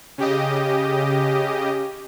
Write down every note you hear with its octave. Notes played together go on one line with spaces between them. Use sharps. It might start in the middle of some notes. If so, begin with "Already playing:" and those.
C#3 G4 D#5